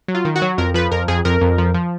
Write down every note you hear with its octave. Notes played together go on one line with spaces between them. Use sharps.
F#3
F4
D#3
F#4
F#3
F2 A#4
F3 B4
F2 A#4
F2 G#4
F2 A#4
F2
F3
F3